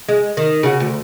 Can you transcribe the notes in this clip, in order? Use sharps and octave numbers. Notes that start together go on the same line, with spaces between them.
G#3
D#3
C#3 F#4
D2